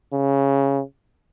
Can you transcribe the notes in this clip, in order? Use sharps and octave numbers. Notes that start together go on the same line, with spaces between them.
C#3